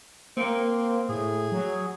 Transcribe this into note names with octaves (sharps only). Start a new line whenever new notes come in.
A#3 C4
A2 G#4
F#3